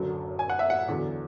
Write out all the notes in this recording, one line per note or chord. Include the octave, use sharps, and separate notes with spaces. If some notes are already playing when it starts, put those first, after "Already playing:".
Already playing: F#1 F#2 D3 F#3
G#5
F#5
E5
F#5
E2 D3 F#3